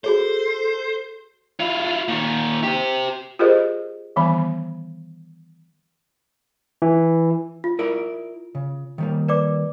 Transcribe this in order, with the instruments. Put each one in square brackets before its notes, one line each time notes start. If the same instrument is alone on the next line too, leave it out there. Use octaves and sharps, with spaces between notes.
[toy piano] F#4 G#4 C#5 [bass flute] A4 [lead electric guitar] C5
[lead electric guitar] E4 F4
A#2 D#3
G4 C5
[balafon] F4 G4 G#4 A#4 C5 D#5
D#3 E3 G3 B3 B5
[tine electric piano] E3
[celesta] F4
[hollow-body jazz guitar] E4 A#4 D5
C#3
D#3 G3 A#3
[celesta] B4 D5 D6